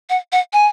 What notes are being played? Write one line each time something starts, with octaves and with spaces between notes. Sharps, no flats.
F#5
F#5
G#5